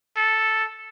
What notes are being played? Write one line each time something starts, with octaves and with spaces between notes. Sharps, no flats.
A4